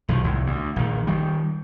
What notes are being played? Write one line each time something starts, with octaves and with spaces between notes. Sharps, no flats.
B1 D#3 F3
C2 A2
D2
A#1 D#3
D#3 G3